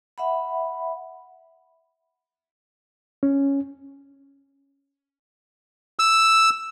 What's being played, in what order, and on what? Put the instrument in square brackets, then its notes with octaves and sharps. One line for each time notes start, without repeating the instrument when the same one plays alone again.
[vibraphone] E5 F#5 B5
[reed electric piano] C#4
[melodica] E6